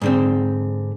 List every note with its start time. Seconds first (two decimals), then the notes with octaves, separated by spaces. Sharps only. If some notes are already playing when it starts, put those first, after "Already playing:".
0.01 G#2 D3 C4